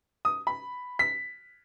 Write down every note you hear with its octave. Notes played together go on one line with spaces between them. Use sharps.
D#6
B5
B6